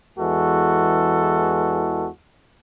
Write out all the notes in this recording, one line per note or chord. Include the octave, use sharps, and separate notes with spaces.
E2 E3 G#3 F#4 A4